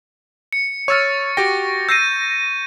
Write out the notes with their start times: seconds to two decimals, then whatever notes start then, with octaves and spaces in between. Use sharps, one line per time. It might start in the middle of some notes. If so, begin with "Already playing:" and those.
0.53 C#7
0.88 C#5 C#6 E6 F6 A6
1.37 F#4 G4 G5 A#6
1.89 E6 G6 A#6 C7 D#7